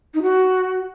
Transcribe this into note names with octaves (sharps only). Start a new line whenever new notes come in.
D#4
F#4